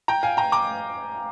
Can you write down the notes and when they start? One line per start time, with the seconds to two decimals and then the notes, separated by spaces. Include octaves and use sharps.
0.08 G5 A#5
0.23 F5 G#5
0.37 G5 A#5
0.52 A#5 D6